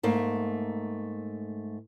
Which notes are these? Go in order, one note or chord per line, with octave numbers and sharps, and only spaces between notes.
G#2 A3 A#3